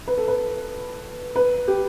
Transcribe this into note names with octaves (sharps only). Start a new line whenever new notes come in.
B4
A4
B4
B4
G4